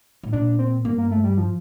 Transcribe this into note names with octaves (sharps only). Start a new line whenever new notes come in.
A2
A#2 D4
C4
G2 A#3
A#3
A3
G3
F3